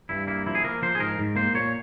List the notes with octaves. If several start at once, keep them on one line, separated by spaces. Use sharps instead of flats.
G2 E4
A#3 E4
F3 E4
G#4
A#3 A#4
F3 C5
G#4
G#2 A#4
G#2
A#3 C5
A#2 C#5